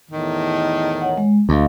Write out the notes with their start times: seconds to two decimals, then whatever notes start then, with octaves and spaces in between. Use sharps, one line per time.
0.10 E2 A2 D#3
1.01 C#5 F#5
1.18 G#3
1.49 D2 A3 D#5 F5